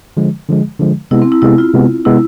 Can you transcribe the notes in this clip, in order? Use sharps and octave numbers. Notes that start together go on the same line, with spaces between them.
D3 F3 G#3
D3 F3 G#3
D3 F3 G#3
C3 G#3 B3 E4
C4
E4
C3 G#3 B3 E4
F4
C3 G#3 B3
C3 G#3 B3 E4